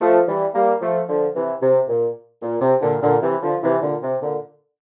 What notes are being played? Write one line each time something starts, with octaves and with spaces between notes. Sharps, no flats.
F3 A3
E3 G3
G3 A#3
F3 A3
D3 F3
C3 E3
C3
A#2
A#2
C3
A#2 D3
A#2 D3
C3 E3
D3 F3
C3 E3
A#2 D3
C3
A#2 D3